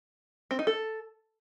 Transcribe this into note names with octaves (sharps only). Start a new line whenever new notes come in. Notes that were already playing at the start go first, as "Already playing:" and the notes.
C4
D#4
A4